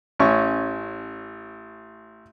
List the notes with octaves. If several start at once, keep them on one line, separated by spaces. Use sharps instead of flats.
A1 C#4 C#6